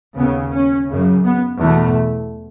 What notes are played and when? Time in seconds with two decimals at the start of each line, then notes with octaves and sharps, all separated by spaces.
0.17 D#2 C#3 B3
0.52 C#4
0.88 F#2 C#3
1.25 B3
1.60 E2 B2 A3